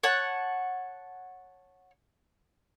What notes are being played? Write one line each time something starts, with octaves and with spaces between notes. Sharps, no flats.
C#5 F#5 A5